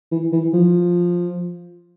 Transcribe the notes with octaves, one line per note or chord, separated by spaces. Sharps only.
E3
E3
F3